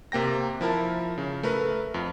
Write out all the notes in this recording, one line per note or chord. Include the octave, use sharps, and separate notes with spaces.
C3 A#3 G5 A#6
F3 E4 A#4 A5
C#3
A3 A#4 B4
F2